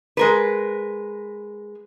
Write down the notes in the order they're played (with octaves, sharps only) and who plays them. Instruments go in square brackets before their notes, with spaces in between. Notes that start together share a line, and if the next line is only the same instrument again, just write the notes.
[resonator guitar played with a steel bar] G#3 A#4 B4